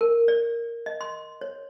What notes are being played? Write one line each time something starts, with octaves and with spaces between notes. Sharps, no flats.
A#4
D5
D#5
C6
C#5